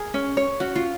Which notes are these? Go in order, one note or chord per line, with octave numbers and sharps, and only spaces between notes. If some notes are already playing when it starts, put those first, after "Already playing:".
Already playing: G#4 A#4
C#4
C#5
C#4 F#4
F4